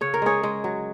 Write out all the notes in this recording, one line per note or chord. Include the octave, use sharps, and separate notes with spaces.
C#3 C#5
A#4
G#3 G#4 C#5
G#3
F#3